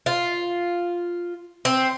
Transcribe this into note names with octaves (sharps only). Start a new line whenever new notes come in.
F4
C4